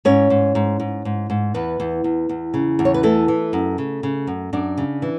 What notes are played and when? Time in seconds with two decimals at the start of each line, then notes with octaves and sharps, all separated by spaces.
0.05 G#2 C#4 C#5
0.30 G#2
0.55 G#2
0.80 G#2
1.05 G#2
1.30 G#2
1.54 E2 B3 B4
1.80 E2
2.04 E2
2.29 E2
2.54 C#3
2.79 E2
2.85 C#5
2.94 B4
3.03 E3 A3 A4
3.28 E3
3.53 F#2
3.78 C#3
4.03 C#3
4.27 F#2
4.53 F#2 D4 D5
4.78 C#3
5.02 E3